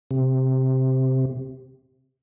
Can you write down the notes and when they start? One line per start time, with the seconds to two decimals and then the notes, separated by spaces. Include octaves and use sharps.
0.11 C3